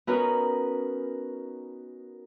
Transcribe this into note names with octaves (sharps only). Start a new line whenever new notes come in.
B3 C#4 D#4 F#4 A#4 B4